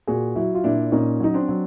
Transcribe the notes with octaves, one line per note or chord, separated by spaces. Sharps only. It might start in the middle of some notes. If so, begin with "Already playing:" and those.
A#2 F#4 G#4
F#3 E4 F#4
F4
A#2 D4 E4
A#2 C#4 D#4
F#3 D#4
C4 D4
F#3